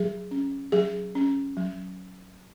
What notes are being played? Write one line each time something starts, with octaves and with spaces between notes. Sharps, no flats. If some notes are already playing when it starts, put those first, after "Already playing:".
Already playing: F#3 G#4
C#4
F#3 G#4
C#4
F#3